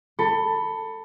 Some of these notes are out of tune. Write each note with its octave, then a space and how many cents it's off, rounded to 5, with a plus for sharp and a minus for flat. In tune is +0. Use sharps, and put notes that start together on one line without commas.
A4 +20 B5 +0